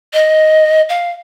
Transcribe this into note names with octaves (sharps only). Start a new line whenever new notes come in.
D#5
F5